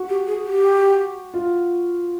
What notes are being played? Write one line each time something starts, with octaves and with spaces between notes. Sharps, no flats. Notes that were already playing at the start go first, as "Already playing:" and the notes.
Already playing: F#4
G4
G#4
G4
F4